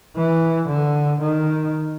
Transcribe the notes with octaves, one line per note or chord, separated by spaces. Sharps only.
E3
D3
D#3